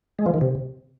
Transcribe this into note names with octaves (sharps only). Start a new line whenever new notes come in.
G#3
F3
D#3
C3